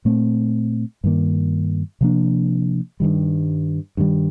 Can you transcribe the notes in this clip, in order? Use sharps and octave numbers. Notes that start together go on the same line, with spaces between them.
A#2 A3 C4
G2 D#3 A#3
C3 F3 A#3 D4
G2 D#3 G3
G2 D#3 G3